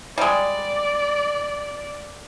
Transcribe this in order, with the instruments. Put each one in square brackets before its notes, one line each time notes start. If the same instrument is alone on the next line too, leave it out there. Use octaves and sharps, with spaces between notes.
[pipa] G3 G#3 [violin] D5